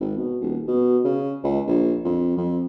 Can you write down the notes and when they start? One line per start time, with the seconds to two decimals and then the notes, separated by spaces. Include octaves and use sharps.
0.01 G#1
0.17 B2
0.41 D#1
0.68 B2
1.04 C#3
1.44 C#2
1.67 A#1
2.04 F2
2.37 F2